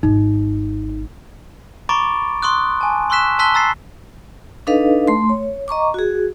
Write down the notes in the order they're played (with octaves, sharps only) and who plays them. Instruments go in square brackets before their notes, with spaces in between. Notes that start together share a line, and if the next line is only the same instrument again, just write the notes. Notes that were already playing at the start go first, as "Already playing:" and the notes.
[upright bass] G#1 [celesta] D#4
[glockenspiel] A#5 B5 C#6 D6 A6 D7
C6 C#6 D#6 F#6
G#5 A5
C6 C#6 E6 F#6 B6 E7
A5 C6 E6 F#6 B6 G7
A#5 E6 A6 C7
[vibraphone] D4 D#4 A4 B4 D#5 F5
A3 C6
C#5
D#5 A#5 C#6 D6
F#4 G#4